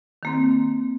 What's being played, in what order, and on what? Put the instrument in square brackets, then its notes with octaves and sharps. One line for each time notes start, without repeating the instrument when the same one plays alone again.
[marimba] D#3 A#3 C4